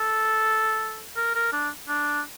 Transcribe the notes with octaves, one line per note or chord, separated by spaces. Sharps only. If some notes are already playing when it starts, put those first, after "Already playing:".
Already playing: A4
A#4
A#4
D4
D4